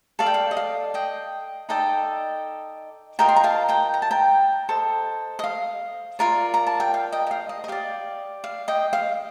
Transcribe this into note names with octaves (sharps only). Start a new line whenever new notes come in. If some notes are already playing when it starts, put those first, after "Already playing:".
A4 D5 F5
G5
F5
D#5
F5
D#5 G5
D#4 A4 D5 D#5 G5
F4 A#4 D#5 G5 A#5
C6
A#5
F5 A5
G5 A#5
A#5
A5
G5 A#5
A4 C5 D#5
D#5
F5
F4 A#4 D5
A#5
A5
G5
F5
D#5 G5
D#5
F5
D#5
D#5
G4 D5 F5
F5
D#5 G5
F5